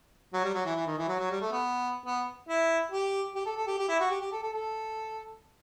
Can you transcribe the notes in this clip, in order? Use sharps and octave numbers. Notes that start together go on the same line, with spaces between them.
F#3
G3
F#3
E3
E3
D#3
E3
F#3
F#3
G3
A3
B3
B3
E4
G4
G4
A4
A4
G4
G4
E4
F#4
G4
G4
A4
A4
A4